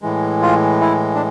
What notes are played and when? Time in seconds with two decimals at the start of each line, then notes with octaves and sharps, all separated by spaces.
0.02 A2 E3 G#3
0.42 F4
0.81 E4
1.15 D4